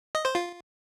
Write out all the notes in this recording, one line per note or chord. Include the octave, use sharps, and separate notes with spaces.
D#5
C5
F4